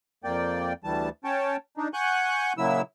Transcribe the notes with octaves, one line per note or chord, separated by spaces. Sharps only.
F2 A#3 D5 G5
D2 E3 G3 A5
C#4 C#5 G5 A5
D4 D#4
F#5 G#5 C#6 F#6 G6
A#2 C#3 F#3 E4 E6